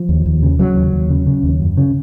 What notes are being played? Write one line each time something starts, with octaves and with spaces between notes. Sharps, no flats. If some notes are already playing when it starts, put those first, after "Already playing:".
Already playing: F3
D#2
D#2
C#3
C#3 F#3
D#2
D#2
C#3
C#3
D#2
F#2
C#3